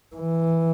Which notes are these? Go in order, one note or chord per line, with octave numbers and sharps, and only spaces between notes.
E3